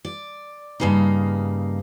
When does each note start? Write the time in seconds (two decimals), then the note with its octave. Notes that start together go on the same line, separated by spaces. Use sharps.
0.05 D5
0.80 G2 A#2 C#3 A#3 D#4